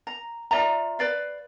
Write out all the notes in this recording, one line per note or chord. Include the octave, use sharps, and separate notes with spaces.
A#5
F4 D5 E5 A#5
B4 D5 F5